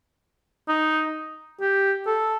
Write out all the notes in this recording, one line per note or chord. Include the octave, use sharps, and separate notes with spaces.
D#4
G4
A4